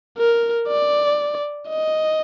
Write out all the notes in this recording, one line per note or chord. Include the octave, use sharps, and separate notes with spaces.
A#4
D5
D#5